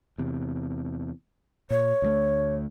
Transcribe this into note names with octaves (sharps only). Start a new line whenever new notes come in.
E2 C3
A#2 C#5
D2 F3 A3